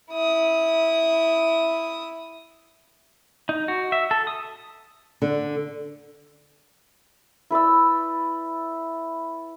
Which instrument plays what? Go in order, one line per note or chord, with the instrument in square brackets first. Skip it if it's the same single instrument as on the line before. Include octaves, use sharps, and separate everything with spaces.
[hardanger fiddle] E4 D#6
[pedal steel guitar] D#4
F#4
E5
A4
D#6
[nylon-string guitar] D3
[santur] E4 B4 D5 E6